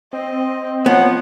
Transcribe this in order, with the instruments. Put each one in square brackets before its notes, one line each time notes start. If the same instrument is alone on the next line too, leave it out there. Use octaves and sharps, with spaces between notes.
[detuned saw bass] C4 [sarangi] D#5
[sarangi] F3 [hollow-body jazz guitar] B3 [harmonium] C#5 F#5